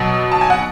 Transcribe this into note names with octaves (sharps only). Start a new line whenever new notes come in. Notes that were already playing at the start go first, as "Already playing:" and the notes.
Already playing: B2 F#3 B3 D#5
A5
G#5
F#5